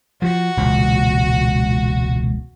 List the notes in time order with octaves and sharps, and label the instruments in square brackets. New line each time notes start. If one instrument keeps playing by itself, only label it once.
[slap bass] F3 [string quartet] F#4
[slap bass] E1 C#2 A#2